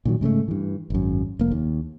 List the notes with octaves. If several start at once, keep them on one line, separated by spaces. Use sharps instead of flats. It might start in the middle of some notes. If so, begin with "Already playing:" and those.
A#2 D#3 F#3
G#2 C#3 G3 A3
G2 E3
G#1 F#2
F1 A#3
D#2